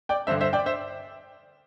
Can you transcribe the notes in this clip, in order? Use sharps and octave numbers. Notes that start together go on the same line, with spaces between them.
D5 G5
G2 D3 C5 E5
C5 E5
D5 G5
C5 E5